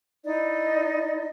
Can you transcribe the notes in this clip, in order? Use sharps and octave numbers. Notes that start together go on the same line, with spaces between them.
D#4 E4 D5 D#5